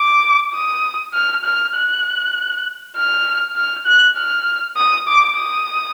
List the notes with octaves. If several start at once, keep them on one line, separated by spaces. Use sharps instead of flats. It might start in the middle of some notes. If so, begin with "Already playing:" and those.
Already playing: D6
D#6
F6
F6
F#6
F6
F6
F#6
F6
D#6
D6
D#6